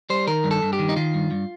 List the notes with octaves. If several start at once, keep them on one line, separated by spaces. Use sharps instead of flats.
G3 C5
D#3 A#4
G2
A4
G2
G4
D#3
D#4
D#3 F4
G2
G2